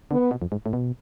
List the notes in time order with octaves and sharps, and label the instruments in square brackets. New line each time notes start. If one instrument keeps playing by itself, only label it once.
[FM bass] D3 [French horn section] B3
[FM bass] B2
F2
G#2
A2
B2